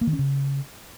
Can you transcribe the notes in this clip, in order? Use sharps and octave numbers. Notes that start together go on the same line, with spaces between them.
A#3
D#3
C#4
C#3